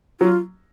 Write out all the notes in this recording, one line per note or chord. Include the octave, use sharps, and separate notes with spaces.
F#3 F4